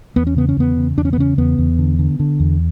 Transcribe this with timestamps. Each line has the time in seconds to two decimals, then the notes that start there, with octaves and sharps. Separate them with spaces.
0.16 E2 B3
0.27 C#4
0.36 C#3 B3
0.49 C#4
0.57 E2 B3
0.77 C#3
0.97 E2 D4
1.05 C#4
1.13 B3
1.18 C#3 C#4
1.38 E2 B3
1.58 E2
1.78 D3
1.99 D3
2.20 D3
2.40 E2